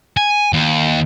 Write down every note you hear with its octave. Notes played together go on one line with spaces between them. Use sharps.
G#5
D#2